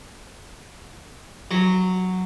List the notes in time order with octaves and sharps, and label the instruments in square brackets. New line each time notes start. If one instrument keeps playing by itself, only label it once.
[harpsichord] F#3